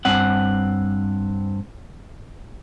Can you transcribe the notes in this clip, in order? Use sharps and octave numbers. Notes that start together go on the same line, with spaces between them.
G2 C4 F#5